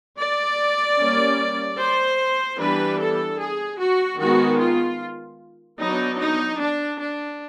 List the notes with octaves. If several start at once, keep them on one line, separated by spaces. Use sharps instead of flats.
D5
G3 A#3 C#4
C5
E3 G3 B3 D4 B4
A4
G#4
F#4
D#3 G#3 B3 F#4
F4
F#3 B3 D4 D#4
D#4
D4
D4